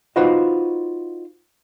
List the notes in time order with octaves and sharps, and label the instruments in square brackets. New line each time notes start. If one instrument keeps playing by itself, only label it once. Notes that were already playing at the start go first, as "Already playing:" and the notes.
[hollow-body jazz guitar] D#4 F4 F#4 B4 C5 D#5